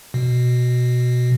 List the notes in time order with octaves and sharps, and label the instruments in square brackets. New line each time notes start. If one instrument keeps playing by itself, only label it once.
[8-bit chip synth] B2